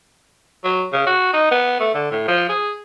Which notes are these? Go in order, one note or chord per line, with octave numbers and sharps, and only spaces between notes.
F#3
C#3
F#4
D#4
B3
A3
D3
A2
F3
G#4